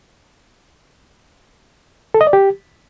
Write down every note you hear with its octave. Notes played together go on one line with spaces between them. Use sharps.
A4
D#5
D5
G4